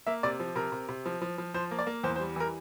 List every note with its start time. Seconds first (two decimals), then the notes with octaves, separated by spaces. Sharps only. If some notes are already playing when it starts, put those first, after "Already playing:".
0.07 A#3 E5
0.23 C3 D5
0.40 F3
0.56 C3 A#4
0.72 C3
0.89 C3
1.06 F3
1.22 F3
1.38 F3
1.54 F3 C5
1.71 A#3
1.79 D5
1.87 A#3
2.03 E2 C5
2.16 C5
2.20 G3
2.36 E3 A#4